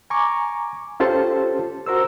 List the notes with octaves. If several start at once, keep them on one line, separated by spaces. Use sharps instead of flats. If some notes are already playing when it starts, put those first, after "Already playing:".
G#5 A#5 C#6 D6
C#4 F4 G4 A4 C5 A5
F#4 A#4 C5 E6